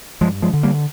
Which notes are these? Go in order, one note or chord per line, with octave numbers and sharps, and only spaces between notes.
G2 F3 G#3
F3 G#3
D3
G3 A#3